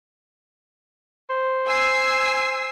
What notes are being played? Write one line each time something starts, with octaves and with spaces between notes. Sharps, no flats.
C5
G#5 E6 C7